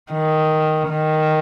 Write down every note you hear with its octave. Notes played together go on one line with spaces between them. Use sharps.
D#3
D#3